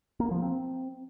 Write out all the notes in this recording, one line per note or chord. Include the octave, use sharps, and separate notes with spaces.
A#3
F3
C4